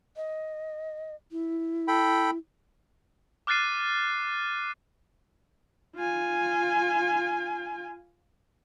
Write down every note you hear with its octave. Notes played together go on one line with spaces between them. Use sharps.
D#5
E4
A4 G5 B5
D6 F6 F#6 A6 C7 D#7
F4 G#5